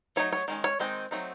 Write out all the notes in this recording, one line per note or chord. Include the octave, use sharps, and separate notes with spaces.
F#3 A3 D#4 C#5
C#5
D#3 G#3 C#4
C#5
D#3 G#3 C4 D#4
F#3 A3 C4 D#4